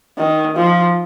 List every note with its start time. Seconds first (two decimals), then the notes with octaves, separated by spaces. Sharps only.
0.18 D#3
0.56 F3